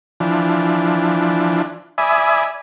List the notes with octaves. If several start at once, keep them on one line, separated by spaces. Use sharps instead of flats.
E3 F3 D4
D5 E5 G#5 B5 D#6